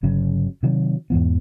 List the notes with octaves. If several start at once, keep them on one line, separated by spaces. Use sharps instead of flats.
G1 C#3 F#3
C3 D#3 F#3
E2 G#2 E3 B3